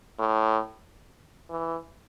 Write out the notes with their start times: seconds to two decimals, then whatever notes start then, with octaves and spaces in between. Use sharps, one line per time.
0.19 A2
1.50 E3